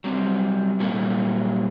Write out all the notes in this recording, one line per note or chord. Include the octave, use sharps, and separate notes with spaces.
F#3 G3 C4
A#2 F#3 G3 A3 A#3